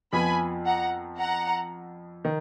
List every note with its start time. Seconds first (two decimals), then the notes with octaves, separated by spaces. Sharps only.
0.13 F2 F3 B3 F4 G#5 B5
0.65 F#5 A#5
1.18 F#5 A#5
2.25 D#3